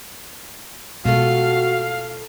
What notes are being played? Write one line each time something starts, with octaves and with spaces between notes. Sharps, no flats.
B2 G#3 A3 B3 F4 F#4 A4 F5